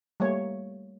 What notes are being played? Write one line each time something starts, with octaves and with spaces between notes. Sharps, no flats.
G3 A3 A#3 C#5